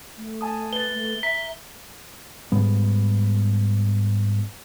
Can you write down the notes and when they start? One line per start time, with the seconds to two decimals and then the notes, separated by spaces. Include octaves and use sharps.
0.18 A3
0.41 G#5 A5 D#6
0.73 B4 A6 G7
0.93 A3
1.23 E5 A#5 B6
2.52 G#2 G3 B3